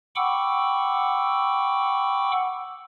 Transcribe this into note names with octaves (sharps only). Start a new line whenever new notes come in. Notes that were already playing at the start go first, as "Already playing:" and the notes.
F#5 G5 B5 C#6 D6 E6